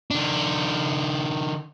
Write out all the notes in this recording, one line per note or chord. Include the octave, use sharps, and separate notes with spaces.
D#3 D4